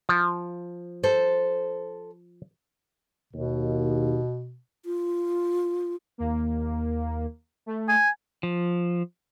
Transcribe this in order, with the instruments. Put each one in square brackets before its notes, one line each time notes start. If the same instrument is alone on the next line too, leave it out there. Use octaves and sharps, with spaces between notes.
[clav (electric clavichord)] F3
[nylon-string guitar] A4 C5
[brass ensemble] D#2 [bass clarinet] B2
[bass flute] F4
[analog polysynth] D#2 A#3
A3
[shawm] G#5
[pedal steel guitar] F3